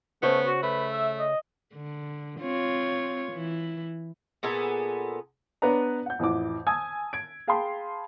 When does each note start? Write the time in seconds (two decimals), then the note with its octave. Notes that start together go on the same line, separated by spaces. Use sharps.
0.23 C#3 A3 B3 C5 C#5
0.46 F#4
0.63 A3 B4
0.93 E5
1.19 D#5
1.75 D3
2.40 C4 F4 C#5
3.32 E3 E4
4.43 A#2 B3 G#4 A4
5.62 B3 D4 B4 C#5 D5 A#5
6.06 F#5 G6
6.19 A1 F2 E3 D6
6.66 G#5 A5 D#6 E6 G#6
7.13 G#6 D7
7.47 G#4 F5 G5 A5 B5 C6